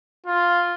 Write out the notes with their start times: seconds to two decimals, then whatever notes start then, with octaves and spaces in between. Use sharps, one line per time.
0.26 F4